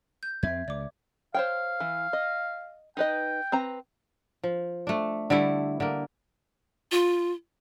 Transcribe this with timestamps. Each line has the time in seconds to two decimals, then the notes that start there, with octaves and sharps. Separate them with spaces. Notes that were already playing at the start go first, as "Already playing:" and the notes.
0.23 G6
0.43 F2 B3 C4 E5 G#6
0.68 C#2 D5 D6
1.34 C5 C#5 F5 G5
1.80 E3
2.13 D#5
2.97 D#4 B4 D#5 G5
3.52 C4 B4 A#5
4.43 F3
4.87 A3 D4
5.30 D3 G3 A3 E4
5.80 D3 A#3
6.91 F4